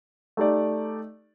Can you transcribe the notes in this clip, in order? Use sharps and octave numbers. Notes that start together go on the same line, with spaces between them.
A3 D#4 G4 D5